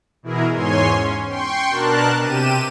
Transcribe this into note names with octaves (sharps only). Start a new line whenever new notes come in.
B2 E3 E4 G#4 A#4
E2 G#2 C#5 G#5 C6
C#4
G5 C6 C#6
B2 D4 A#4 A5 F#6
C3 G4 D#7 E7